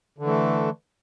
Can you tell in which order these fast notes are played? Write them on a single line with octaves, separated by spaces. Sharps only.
D3 E3 A3